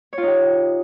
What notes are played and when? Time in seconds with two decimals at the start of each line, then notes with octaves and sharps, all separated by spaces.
0.13 C#5
0.18 F4
0.23 D#4
0.28 G4